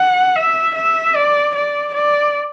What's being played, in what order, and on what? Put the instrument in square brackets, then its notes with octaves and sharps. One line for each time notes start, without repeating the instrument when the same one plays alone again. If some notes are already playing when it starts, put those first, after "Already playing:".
Already playing: [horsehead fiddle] F#5
E5
E5
D5
D5
D5